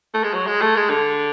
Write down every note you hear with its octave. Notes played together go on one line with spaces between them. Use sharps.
A3
G#3
F#3
G#3
A3
G#3
D3